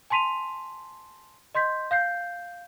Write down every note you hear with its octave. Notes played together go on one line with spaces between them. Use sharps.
G#5 A5 C6 B6 D#7 F7
D#5 C6 G6 B6
F5 G6 C7